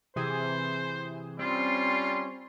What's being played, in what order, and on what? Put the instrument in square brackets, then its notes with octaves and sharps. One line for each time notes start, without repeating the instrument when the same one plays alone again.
[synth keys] C3 E3 G#4 [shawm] C5
[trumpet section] G3 C#4 C6 [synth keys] C4 [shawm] F4